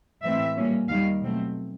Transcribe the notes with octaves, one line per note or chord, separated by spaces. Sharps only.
A2 E3 G#3 C4 E5
A#2 G3 A#3 C#4
D#2 D#3 G3 F5
B2 F#3 A3 C4